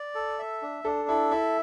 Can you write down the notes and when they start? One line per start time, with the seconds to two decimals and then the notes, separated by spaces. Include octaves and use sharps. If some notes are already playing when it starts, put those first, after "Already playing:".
Already playing: D5
0.15 A4
0.39 E5
0.62 D4
0.84 D4 A4
1.09 E4 A4
1.31 E4 E5